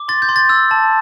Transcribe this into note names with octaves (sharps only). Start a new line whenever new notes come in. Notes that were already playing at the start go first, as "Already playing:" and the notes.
Already playing: D6
C6 A6
G6
C6
A6
E6
A5